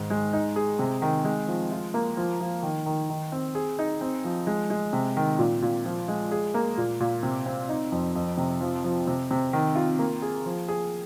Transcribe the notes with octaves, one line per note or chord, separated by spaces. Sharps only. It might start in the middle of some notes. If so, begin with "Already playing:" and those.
Already playing: G#2 D#3
G#3
D#4
G#4
C3
D#3
G#3
F3
F4
A#3
F3
F3
D#3
D#3
D#3
C4
G#4
D#4
C4
F3
G#3
G#3
C3
D#3
A#2
A#2
F3
G#3
G#4
A#3
A#2
A#2
C3
C4
D#4
F2
F2
C3
F3
F3
C3
C3
D#3
F4
A#3
G#4
F3
G#4